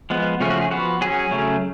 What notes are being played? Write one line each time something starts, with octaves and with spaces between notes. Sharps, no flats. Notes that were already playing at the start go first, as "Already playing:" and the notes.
F3 G#3 B3
C#3 F3 A3 C#4
F#4
G#4
F3 B3 F#4
F#3 C#4 G#4
C#3 F#3 A3 C#4